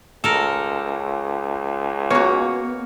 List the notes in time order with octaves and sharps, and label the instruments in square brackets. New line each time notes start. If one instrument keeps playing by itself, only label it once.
[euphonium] C#2 [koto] A4 A#4
[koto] A#3 [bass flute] B3 [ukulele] F#4 C#5